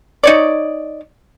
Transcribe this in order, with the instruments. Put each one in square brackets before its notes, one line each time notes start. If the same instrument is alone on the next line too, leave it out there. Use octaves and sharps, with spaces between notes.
[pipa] D#4 C#5 D5